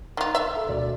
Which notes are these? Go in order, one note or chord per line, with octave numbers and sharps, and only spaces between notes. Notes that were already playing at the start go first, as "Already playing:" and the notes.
D#3 F4
E5
A4 A#4
D2 B2 D5